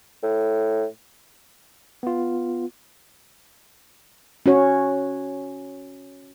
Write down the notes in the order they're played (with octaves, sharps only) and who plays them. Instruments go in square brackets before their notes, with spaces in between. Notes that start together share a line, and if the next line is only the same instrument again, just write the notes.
[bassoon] A2
[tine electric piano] B3 F4
[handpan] C#4 F#4 C#5